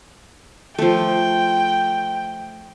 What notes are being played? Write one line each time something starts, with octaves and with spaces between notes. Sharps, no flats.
F3 A3 G5